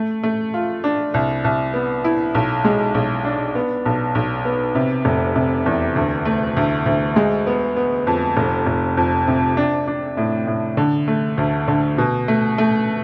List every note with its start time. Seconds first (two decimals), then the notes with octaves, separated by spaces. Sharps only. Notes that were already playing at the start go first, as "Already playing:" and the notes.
Already playing: A3
0.23 A3
0.54 F4
0.84 D4
1.14 C2
1.44 C2
1.74 B3
2.04 E4
2.35 B1
2.65 G#3
2.95 B1
3.25 D4
3.55 B3
3.86 B1
4.15 B1
4.45 B3
4.75 C3
5.05 F1
5.36 C3
5.66 E2
5.96 D2
6.25 A3
6.57 D2
6.86 D2
7.16 G#3
7.47 B3
7.77 B3
8.07 F2
8.37 F1
8.67 F1
8.97 F2
9.28 C3
9.57 D4
9.87 D4
10.17 A2
10.47 A2
10.77 D3
11.08 A3
11.38 D2
11.68 D3
11.98 B2
12.28 A3
12.58 A3